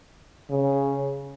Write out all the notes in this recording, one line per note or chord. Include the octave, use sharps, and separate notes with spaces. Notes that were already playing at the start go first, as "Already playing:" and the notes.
C#3